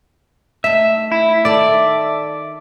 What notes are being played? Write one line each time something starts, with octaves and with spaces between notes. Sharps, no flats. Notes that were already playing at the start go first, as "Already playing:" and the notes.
A3 D#4 E5
E4 E5
D#3 A4 D5